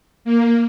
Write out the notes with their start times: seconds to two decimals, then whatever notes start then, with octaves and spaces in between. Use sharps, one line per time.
0.25 A#3